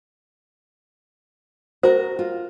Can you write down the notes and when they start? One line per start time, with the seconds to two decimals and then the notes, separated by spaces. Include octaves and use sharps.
1.83 F#4 A#4 C5
2.19 F4